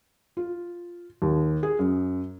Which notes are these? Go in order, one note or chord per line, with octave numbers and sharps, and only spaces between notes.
F4
D#2
G#4
F#2